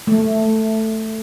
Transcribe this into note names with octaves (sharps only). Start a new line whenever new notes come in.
A3